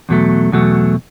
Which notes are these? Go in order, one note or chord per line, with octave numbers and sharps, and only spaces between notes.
E2 B2 F#3 A3
E2 B2 F#3 A3